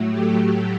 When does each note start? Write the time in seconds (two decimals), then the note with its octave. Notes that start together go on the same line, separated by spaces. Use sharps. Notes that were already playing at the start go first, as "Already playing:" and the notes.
Already playing: A2 F#3 A3
0.10 G4